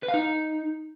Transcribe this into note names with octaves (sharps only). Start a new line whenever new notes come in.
B4
F5
D#4